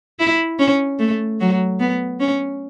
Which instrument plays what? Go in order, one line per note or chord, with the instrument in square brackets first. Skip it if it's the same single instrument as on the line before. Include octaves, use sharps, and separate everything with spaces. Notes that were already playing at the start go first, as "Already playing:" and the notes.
[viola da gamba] E4
C#4
A3
F#3
B3
C#4